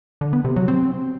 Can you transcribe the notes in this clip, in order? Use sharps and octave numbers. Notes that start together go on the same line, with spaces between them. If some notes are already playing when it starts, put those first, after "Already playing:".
D3
B3
C3
F#3
C4